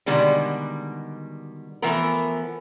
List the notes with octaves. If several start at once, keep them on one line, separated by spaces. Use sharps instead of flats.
B2 D3 D#3 G3 G#3
E3 F3 A3 B3 A#4